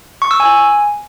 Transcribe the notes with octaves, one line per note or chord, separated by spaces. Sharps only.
C#6
E6
G#5